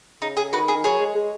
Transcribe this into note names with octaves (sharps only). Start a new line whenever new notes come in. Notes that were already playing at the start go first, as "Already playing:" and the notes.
C#3 D#4
G#4
D#3 F#4 B4
G#4
D#3
F#3 G#4 C#5
G#3
G#3